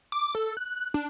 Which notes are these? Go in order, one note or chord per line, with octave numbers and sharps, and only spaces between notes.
D6
A4
F#6
D4